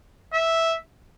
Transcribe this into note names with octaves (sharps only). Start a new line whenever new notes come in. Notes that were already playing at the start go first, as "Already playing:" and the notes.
E5